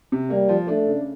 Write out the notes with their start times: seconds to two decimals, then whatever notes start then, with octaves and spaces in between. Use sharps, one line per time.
0.12 C3
0.30 G3 A#3
0.49 F3
0.68 A3 D4
0.87 C#3